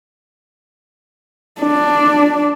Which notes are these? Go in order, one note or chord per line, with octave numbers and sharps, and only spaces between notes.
D4